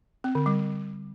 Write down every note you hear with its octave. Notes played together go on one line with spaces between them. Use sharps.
C4
D3
G3